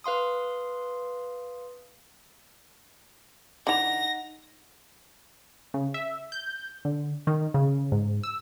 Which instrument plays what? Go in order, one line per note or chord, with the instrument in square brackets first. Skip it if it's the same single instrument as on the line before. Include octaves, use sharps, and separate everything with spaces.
[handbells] B4 F5 C6 D#6
[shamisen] D3 E3 [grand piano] D#4 F#5 F7 [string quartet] A#6
[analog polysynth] C#3
E5
G6
D3
D#3
C#3
G#2
E6